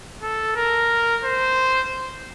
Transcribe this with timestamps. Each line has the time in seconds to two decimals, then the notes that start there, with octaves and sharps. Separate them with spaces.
0.22 A4
0.56 A#4
1.24 C5